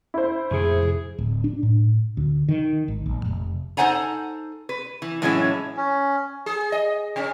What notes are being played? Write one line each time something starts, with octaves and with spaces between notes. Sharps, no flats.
E4 C5
F1 F2 A#2 G#4
D1
D4
A2
D2
D#3
G#1
A#1
F1
D#4 A4 C5 F#5 G#5 A#5
B4
E3
A2 E3 F#3 G#3 C#4 E4
C#4
G#4
D#5
C3 C#4